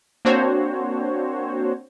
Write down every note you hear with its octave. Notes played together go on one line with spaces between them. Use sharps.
A#3 C4 D4 F#4 C5 C#5